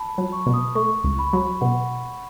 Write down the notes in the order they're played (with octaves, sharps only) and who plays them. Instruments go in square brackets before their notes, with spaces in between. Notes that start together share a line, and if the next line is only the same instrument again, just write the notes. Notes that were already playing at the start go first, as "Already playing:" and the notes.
Already playing: [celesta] A5 B5
[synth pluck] F#3
[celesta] C#6
[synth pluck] B2
[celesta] D#6
[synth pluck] A3 [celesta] C#6
[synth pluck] C#2
[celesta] B5
[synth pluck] F#3
[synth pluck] B2 [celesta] F#5